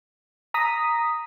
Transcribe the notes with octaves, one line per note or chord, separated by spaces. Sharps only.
A#5 D#6 B6